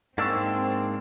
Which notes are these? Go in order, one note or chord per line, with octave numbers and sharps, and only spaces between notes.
G#2 A#3 C4 D4 C#6 E6 A6